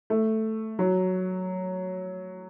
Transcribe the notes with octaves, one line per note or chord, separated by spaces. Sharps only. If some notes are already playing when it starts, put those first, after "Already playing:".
A3
F#3